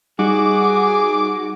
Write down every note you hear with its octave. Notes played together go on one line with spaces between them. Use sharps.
G3 D#4 F#4 G#4 D6